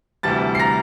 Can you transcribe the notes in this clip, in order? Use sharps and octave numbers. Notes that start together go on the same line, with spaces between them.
D2 C3 E3 G3 A5 A6
C7
A#5 A#6